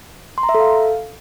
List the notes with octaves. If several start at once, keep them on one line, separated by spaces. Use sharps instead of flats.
C6
A#5
E5
A4
F5